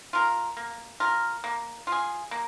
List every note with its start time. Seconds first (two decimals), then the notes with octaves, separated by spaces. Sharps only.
0.13 F4 A#4
0.57 A#3
1.00 F4 A#4
1.44 A#3
1.87 F4 G#4
2.31 A#3